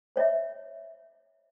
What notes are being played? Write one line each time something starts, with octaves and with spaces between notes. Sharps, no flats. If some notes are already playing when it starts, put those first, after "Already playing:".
C5 C#5 D#5 E5